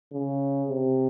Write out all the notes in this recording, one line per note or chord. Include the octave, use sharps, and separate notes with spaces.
C#3
C3